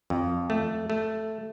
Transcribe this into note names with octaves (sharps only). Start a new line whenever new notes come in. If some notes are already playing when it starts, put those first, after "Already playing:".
F2
A3
A3